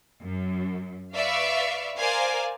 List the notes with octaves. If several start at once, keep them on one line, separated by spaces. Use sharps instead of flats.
F#2
B4 D5 E5 F5 C#6
A#4 C5 D5 F5 G#5